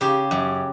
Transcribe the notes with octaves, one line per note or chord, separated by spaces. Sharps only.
C#3 G4
F#2